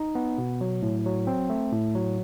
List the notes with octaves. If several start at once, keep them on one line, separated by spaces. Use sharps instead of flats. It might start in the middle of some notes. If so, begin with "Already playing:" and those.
Already playing: D#4
B3
B2
F#3
A2
F#3
C4
A3
A2
F#3